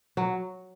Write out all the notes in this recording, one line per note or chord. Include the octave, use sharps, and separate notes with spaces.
F#3